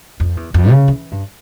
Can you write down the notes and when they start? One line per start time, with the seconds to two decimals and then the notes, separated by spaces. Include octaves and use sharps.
0.20 F2
0.37 E2
0.54 F2
0.70 C#3
0.88 E3
1.11 G2